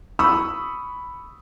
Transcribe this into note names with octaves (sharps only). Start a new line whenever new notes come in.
B5 C#6 D#6 E6